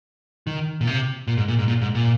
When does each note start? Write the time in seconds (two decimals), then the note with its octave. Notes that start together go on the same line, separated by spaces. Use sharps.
0.47 D#3
0.81 A#2
0.87 C3
1.27 A#2
1.37 G#2
1.48 A#2
1.59 G#2
1.68 A#2
1.81 G#2
1.95 A#2